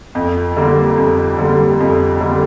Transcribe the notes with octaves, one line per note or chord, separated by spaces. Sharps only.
F2
D3 G3 A#3
F2
D3 G3 A#3
F2
D3 G3 A#3